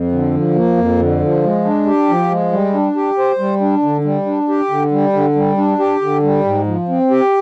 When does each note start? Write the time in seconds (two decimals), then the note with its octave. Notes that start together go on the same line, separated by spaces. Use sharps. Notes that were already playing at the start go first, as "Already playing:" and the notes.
Already playing: F2
0.12 D3
0.35 F3
0.55 A#3
0.77 F2
1.00 D3
1.22 F3
1.44 G#3
1.65 D4
1.86 G4
2.09 F3
2.31 G#3
2.52 G3
2.74 D4
2.96 G4
3.18 C5
3.39 G3
3.61 D4
3.83 D3
4.04 G3
4.26 D4
4.49 G4
4.70 D3
4.91 G3
5.13 D3
5.35 G3
5.57 D4
5.79 G4
6.01 D3
6.23 G3
6.44 G#2
6.66 F3
6.89 C4
7.11 G4